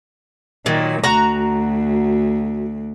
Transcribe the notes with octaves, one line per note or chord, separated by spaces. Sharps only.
A#2 D#3 F#3
D2 F#4 A#5